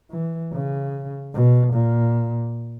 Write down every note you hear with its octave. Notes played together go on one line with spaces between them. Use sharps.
E3
C#3
B2
A#2